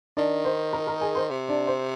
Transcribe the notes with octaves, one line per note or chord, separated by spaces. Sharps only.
D#3 D4 D5
C5
A#4 A#5
A#4 A#5
G#4 G#5
C5 C6
C3
D4 D5
C5